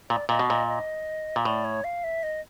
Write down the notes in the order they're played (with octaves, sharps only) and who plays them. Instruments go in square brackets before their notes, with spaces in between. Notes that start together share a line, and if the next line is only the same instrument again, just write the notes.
[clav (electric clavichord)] A#2 [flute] D5
[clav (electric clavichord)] A#2 [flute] D#5
[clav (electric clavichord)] B2
[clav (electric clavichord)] A#2 [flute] D#5
[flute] D#5
[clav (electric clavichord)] A#2
[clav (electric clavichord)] A2 [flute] D5
[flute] C#5
F5
E5
D#5